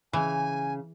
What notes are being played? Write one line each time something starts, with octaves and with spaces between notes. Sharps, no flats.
C#3 E3 G#5